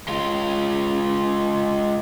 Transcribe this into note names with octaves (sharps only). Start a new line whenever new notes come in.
G#3 F4